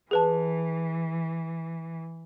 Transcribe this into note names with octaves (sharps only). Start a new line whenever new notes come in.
E3 G#4 B4 A5